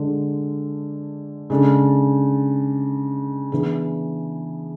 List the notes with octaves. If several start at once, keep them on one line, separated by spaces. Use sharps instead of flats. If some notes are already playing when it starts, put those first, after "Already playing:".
Already playing: D3 G#3 D4
C#3 G#3 D4 A4
E3 B3 D4 G#4